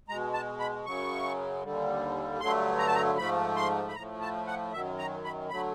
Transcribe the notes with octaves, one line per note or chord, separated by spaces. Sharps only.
B2 G#3 A#5
A5
B5
F#2 C#3 F#3 C#6
D#2 D3 G3
G2 D3 F#3 A3 C6
A#5
A5
A#5
G#2 F3 A3 B5
C6
B5
A2 F3 A3 A#5
A5
F#5
F#2 D#3 F#3 E5
A#5
B5
D3 F#3 A3 B5